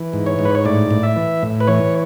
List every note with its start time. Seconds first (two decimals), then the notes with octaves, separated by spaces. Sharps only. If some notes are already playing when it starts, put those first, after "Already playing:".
Already playing: E3
0.13 G#2
0.26 C#5
0.39 G#2
0.45 B4
0.55 C#5
0.65 A2 D5
0.91 A2
1.03 E5
1.16 E3
1.43 A2
1.60 B4
1.67 E3 C#5